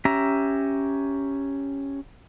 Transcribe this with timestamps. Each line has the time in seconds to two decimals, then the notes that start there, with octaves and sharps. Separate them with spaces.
0.05 C#4 G4 E5 A#5